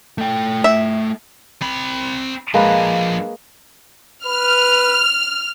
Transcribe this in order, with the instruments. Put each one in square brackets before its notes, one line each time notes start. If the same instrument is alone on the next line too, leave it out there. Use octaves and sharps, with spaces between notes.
[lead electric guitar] A3 G5
[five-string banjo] E5
[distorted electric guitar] C4 B5
[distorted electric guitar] F3 D4 [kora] G#3 A#3 B4
[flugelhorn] B4 [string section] F6